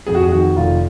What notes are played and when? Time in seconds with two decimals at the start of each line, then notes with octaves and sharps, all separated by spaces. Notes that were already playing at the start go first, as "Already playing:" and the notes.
0.06 F2 G#4
0.15 F#4
0.23 G#4
0.32 D#3 F#4
0.56 F1 F4